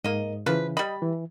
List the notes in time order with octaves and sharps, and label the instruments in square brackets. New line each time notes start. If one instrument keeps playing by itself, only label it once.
[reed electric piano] G#2 [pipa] A#3 D#5
[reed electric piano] C#3 E3 [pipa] F3 B4
[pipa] G3 B5 [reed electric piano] D#5
[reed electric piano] E3